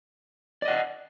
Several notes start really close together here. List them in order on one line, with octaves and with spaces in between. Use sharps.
D5 D#5 F#5